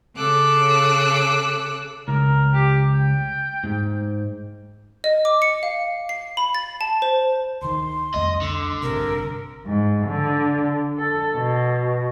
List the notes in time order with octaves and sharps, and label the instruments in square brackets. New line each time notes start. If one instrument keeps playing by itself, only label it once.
[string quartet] C#3 A4 D6 E6 F#6
[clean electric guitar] C#2 [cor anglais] A#4
[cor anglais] G4
G5
[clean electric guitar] G#2
[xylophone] D#5
D6
C#7
F5
C7
B5
A6
A5
C5
[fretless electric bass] D2 D#3 [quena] C6
[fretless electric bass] C2 F2 A3 [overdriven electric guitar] D#5
[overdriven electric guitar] D3
[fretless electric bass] A1 G2 C3 [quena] A#4
[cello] G#2
D3
A4
B2